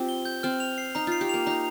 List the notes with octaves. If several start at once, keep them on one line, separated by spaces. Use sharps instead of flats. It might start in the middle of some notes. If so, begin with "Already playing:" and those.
Already playing: C4 F4 G4
G7
G6
C4 F6
F7
C7
D#4 A#5
F4 C7
G4
A#3 F7
D#4 A#5